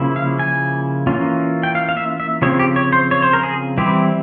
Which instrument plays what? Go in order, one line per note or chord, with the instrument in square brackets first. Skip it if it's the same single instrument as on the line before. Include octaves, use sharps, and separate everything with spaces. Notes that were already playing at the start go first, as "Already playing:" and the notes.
Already playing: [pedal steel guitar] C#3 F3 A#3 E4
F5
G#5
E3 A#3 C#4 F4
G5
F5
F5
E5
E5
C#3 F3 C4 C#5
G4
C#5
C5
C#5
C5
A#4
G#4
E3 G3 C4 E4 G4